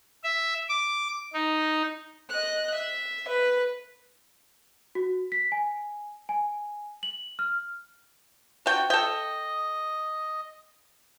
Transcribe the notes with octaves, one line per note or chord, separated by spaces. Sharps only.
E5
D6
D#4
D#5 F#6
E5
B4
F#4
B6
G#5
G#5
F#7
F6
D4 F#4 G5
A4 D#5 G5